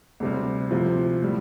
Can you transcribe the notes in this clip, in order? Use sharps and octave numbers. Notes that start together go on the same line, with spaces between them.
D2 C3 G3
D2 C3 F3
A2 G3